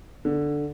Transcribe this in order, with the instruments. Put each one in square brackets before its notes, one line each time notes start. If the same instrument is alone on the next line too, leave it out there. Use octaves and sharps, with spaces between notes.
[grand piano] D3